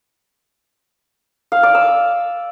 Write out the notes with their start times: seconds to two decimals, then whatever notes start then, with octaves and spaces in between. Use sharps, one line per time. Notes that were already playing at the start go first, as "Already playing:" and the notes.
1.52 F5
1.63 D5
1.75 E6